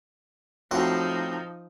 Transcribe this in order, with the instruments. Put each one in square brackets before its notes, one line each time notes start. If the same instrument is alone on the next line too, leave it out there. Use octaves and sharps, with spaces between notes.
[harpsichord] A2 C3 F#4 [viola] F3 D#4